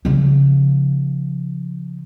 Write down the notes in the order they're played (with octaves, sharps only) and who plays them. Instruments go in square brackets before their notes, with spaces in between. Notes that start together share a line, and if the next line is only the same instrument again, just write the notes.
[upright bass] C#3 F3